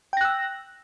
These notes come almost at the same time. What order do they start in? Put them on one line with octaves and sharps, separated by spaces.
G5 A#6 F#6 E6